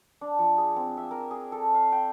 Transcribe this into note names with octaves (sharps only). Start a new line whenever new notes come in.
D4
F3
G#4
C4
E5
A#4
G#4
A4
F5
G5